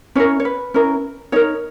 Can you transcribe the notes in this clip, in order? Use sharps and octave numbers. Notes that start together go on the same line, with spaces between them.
C#4 E4 A#4 C#5
C#5
B4
C#4 E4 A#4
D#4 A#4 C#5